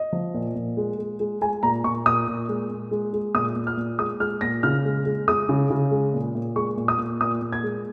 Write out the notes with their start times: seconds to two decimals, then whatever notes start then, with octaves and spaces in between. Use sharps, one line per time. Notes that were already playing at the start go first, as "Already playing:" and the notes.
Already playing: D#5
0.13 F3
0.34 A#2
0.55 A#2
0.77 G#3
0.98 G#3
1.20 G#3
1.41 G#3 G#5
1.63 A#2 A#5
1.84 A#2 C#6
2.05 A#2 D#6
2.27 A#2
2.49 G#3
2.70 A#2
2.91 G#3
3.13 G#3
3.34 A#2 D#6
3.56 A#2
3.67 F6
3.77 A#2
3.99 G#3 D#6
4.20 G#3 F6
4.41 A#2 A#6
4.63 C#3 F6
4.85 G#3
5.05 G#3
5.28 G#3 D#6
5.49 C#3
5.70 C#3
5.91 G#3
6.13 A#2
6.35 A#2
6.56 G#3 C#6
6.77 A#2
6.88 D#6
6.98 A#2
7.21 A#2 D#6
7.42 A#2
7.52 G#6
7.63 G#3